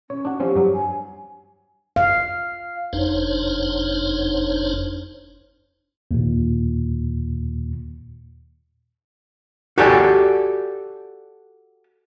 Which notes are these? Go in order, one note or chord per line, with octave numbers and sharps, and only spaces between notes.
C#4 C#5
D4 F#4
F3 C4 C#4 G4
G2 F#3
G#5
F5
F#1 F2 D4 D#4 C5 C#5
D#2 A#2
F#4 G4 A4 D5 G#5